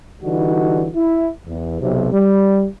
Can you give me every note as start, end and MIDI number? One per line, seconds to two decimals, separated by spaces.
0.22 0.88 50
0.22 0.88 52
0.22 0.88 55
0.22 0.88 63
0.22 0.88 66
0.96 1.28 64
1.46 1.79 40
1.80 2.10 35
1.80 2.10 48
2.12 2.64 55